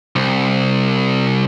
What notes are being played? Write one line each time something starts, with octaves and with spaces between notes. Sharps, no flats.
C2